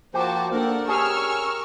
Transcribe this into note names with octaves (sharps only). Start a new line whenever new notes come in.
F3 A#3 F#4 G4 C5 A5
A#3 D4 A4 A#4 D5 F#5
C#4 G4 G#4 G#5 C#6 E6 F6